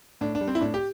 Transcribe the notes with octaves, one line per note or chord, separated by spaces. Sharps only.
A2 D4
D4
G3
C4
E4
A2 D4
G4